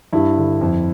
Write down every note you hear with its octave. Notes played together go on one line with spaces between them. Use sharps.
G2 E4
D3
F2